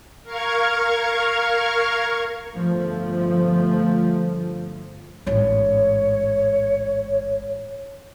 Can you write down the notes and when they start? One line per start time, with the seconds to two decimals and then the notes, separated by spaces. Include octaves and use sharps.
0.24 A#4 F5 C#6 F6 G#6
2.53 G1 F3 A3
5.26 A1 G#2 C#5